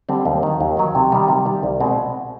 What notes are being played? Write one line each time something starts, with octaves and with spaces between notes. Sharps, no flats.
D3 G3 C4
D#2
D#3 F#3
D#2
D#3 F#3
C3
D#3 G3
C3
D#3 G3
C2
B2 G#3 C4